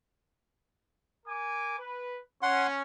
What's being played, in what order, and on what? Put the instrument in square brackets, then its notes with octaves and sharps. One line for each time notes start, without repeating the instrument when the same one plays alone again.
[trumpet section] A#4 G#5 D6
B4
[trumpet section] C#4 [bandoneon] F#5 C6